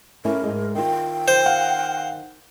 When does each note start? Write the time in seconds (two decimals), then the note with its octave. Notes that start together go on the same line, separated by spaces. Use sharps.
0.25 A3 C#4 E4 A#4
0.43 G#2 G#3
0.75 D#3 F4 G5
1.28 C5
1.46 F5 F#5